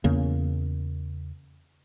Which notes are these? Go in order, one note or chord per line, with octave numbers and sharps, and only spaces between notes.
E2 C#3 A#3